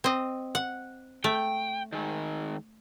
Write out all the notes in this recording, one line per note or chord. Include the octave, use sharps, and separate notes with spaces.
C4 D#5
F#5
A3 G5
D#3 G#3